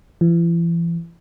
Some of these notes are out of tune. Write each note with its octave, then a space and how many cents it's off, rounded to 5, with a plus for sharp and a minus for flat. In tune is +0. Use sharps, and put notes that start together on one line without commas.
E3 +40